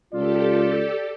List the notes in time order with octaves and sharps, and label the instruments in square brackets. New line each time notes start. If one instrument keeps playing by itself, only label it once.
[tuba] C#2 [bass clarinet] F4 [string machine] G4 A4 [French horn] D5